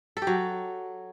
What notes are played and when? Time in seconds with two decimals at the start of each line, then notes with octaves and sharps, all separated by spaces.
0.17 A4
0.22 G4
0.27 F#3